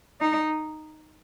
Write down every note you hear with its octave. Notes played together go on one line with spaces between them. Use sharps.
D#4